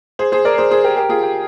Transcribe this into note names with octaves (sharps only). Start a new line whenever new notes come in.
G#4 C5
G#4 C5
A#4 D5
G#4 C5
G#4 C5
G4 A#4
G4 A#4
F4 G#4
G4